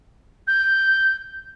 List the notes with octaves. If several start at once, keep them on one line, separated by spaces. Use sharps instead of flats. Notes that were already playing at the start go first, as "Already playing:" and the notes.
G6